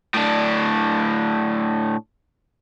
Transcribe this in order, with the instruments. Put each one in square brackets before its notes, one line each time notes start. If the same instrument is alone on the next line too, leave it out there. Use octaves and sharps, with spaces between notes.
[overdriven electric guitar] A2 D4